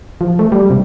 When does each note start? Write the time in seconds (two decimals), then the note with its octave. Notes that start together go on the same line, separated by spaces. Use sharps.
0.21 F3
0.39 A3
0.52 G3
0.70 C3